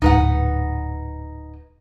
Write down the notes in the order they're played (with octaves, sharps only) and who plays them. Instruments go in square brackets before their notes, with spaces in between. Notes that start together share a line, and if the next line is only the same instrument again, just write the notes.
[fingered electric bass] D1 G#2 [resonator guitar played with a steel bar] D#4 B4 F#5